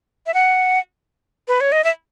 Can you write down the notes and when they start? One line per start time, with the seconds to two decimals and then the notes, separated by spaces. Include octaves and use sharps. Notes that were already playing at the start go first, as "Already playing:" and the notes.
0.26 E5
0.34 F#5
1.48 B4
1.61 C#5
1.72 D#5
1.84 E5